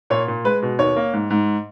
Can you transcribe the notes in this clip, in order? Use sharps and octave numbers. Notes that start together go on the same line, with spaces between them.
A#2 C#5
A#2
G#3 B4
B2
D#2 C#5
A#3
G#2
G#2